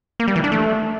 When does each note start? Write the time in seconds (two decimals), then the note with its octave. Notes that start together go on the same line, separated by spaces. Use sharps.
0.20 A#3
0.28 G3
0.36 E3
0.44 D4
0.52 A3